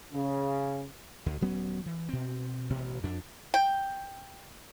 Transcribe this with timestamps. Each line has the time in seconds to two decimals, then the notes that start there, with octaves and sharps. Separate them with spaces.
0.13 C#3
1.26 D2
1.41 D#1 F#3 B3 C#4
1.86 E3
2.09 B2 C4
2.70 A1 B2
3.04 F2 D4
3.54 G5